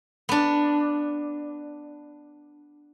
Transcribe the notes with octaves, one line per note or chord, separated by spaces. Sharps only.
B3 D4